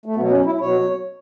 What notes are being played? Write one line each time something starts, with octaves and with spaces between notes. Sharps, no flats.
A3
B2 F#3 B3
C#4
E4
B2 F#3 C#5